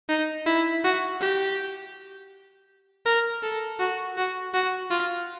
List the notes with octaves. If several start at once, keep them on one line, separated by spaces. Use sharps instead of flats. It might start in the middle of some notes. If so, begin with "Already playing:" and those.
D#4
E4
F#4
G4
A#4
A4
F#4
F#4
F#4
F4